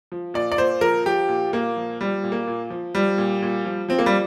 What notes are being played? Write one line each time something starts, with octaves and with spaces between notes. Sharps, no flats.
F3
A#2 D5
D5
A#2 C5
F3 A#4
F3 G4
A#2
A#2 A#3
F3
F3 G3
A#2
A#3
A#2
F3
F3 G3
A#2
A#2
F3
F3 C4
A#3
G3